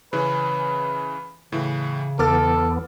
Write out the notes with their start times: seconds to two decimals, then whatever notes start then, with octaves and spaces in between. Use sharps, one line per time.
0.13 C#3 E3 C#4 B4
1.52 A2 C#3 E3
2.19 E2 B3 A4 D6 F6 A6